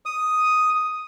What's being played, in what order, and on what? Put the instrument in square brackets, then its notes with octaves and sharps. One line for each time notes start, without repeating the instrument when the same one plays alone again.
[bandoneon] D#6